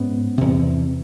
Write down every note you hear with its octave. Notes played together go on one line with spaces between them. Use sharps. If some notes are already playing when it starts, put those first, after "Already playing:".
Already playing: G#2 B3 C#4
E2 C3